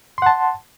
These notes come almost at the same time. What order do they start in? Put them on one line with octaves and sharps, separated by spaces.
C6 F#5 A5